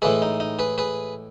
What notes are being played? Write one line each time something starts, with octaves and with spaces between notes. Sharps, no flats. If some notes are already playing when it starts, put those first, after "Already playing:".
A2 E3 G#3 G#4 B4
D#4
D#4
G#4 B4
G#4 B4